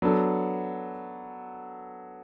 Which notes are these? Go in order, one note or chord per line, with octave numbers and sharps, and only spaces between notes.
F#3 B3 D4 A4